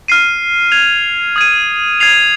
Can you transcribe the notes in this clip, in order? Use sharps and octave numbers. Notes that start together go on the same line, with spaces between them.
F6 C7 D#7
G#6 F7
D#6 G#6 D#7
G#6 C7 F7